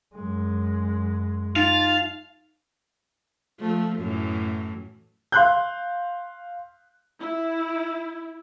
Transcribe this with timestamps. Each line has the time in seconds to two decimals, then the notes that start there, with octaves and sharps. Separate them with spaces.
0.15 F#2 G#3
1.56 D#4 F4 F5 A6
3.60 F3 A3
3.98 F#2 A2 E3
5.32 F5 C6 F#6 G6
7.20 E4